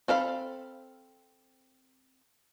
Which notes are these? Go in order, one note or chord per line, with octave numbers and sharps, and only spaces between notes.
C4 A4 F5 B5